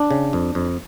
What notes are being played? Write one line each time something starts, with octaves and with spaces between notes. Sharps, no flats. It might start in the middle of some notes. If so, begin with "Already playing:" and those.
Already playing: D4
C#3
F2
F2